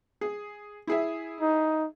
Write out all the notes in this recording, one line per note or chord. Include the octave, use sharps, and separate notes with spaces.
G#4
E4 G#4 E5
D#4